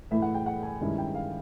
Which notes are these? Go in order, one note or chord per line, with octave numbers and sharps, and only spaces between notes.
A2 E3 A3 E5
F#5
G5
F#5
G#5
G2 D#3 G#3 C#4 E4
G5
F5